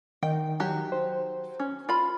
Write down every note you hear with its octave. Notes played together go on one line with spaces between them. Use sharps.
D#3 D#4 G5
F#3 G4
C5
C#4
F4 B5